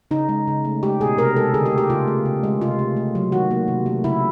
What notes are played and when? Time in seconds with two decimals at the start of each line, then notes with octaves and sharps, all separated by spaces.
0.11 C#3 D#4
0.29 G#3
0.48 C#3
0.65 A3
0.83 G#3 G4
1.00 B2 G#4
1.18 C3 A#4
1.36 G#3 A4
1.54 D3 G#4
1.66 G4
1.72 A3
1.78 G4
1.90 C#3 F4
2.08 A3
2.25 C#3
2.43 G#3
2.61 C3 F4
2.79 A3
2.97 A3
3.15 F#3
3.32 D#3 F#4
3.51 A#3
3.68 C3
3.86 A3
4.04 C#3 E4